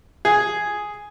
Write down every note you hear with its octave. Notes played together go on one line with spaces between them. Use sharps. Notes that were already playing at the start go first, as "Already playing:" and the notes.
G#4